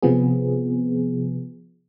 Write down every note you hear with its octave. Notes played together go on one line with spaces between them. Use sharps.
C3 F3 B3 G#4